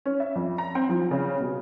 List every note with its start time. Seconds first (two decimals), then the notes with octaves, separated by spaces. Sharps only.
0.06 C#4
0.20 E5
0.35 F2
0.58 A#5
0.75 C4
0.89 F3
1.11 C#3
1.40 B2